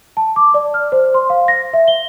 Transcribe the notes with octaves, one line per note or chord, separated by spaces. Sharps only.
A5
D6
D5
F6
C5
C6
F5
A#6
E5
G7